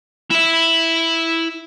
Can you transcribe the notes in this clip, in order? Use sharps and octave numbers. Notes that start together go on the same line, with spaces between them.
E4 E5